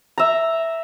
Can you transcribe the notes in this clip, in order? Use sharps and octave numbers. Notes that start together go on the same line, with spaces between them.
E5 A#5